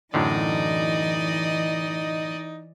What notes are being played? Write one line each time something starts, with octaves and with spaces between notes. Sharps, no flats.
F#2 A2 D3 E3 D#4 D5 D#5